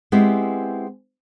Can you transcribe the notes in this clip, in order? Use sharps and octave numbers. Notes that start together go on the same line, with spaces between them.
G#3 B3 C4 E4 G4